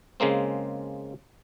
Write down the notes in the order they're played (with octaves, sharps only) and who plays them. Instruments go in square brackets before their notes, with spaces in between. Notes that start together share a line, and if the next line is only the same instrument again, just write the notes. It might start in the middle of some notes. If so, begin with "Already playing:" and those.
[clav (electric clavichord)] C#3 G#3 A#3 C4